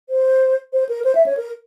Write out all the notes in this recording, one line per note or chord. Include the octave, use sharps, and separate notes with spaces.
C5
C5
A#4
C5
E5
C#5
A#4